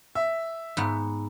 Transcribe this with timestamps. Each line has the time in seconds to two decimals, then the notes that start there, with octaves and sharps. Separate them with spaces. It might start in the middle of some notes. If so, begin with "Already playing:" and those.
0.15 E5
0.77 G#2 B3